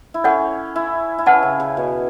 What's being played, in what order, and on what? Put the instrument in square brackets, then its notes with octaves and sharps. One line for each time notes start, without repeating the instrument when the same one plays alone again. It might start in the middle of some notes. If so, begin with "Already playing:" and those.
[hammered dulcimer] E4
[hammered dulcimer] C#4 [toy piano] A4 C#5 F#5
[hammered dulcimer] E4
E4
[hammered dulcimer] C#4 [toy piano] B4 F#5 A5
[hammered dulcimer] C#3
C#3
B2